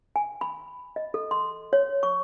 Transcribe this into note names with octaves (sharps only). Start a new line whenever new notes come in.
G#5
B5
D#5
A4
C6
C#5
C#6